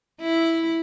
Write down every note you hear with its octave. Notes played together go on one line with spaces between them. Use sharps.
E4